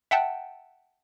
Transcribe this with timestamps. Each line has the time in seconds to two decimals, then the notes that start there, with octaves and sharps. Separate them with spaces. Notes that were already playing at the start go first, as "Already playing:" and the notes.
0.11 E5 F#5 G5 A5